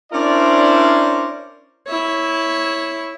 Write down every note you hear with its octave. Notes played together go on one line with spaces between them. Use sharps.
C#4 D4 E4 A#4 C5 D5
E4 C#5